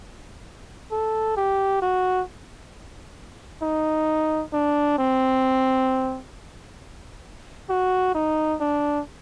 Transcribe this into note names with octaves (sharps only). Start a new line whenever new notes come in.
A4
G4
F#4
D#4
D4
C4
F#4
D#4
D4